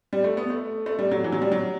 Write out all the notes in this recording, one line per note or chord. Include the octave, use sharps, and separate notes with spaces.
G3
A3
B3
A3
A3
G3
F#3
E3
F#3
G3
F#3